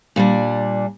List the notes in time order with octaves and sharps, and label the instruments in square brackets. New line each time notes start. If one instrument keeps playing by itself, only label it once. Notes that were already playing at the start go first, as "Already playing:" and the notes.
[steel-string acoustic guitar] A#2 G3 D4